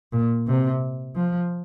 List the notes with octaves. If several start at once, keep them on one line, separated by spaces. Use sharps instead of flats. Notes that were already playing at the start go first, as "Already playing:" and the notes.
A#2
C3
F3